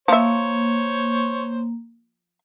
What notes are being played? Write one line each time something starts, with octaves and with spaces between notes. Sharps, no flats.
F3 A#3 C5 C#5 E5